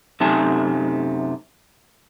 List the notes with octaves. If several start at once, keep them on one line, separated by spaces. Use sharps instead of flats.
F#2 C3 A3 D#4 G#5 A5